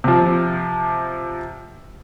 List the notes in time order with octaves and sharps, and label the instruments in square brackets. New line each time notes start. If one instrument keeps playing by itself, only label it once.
[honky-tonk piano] C3 F3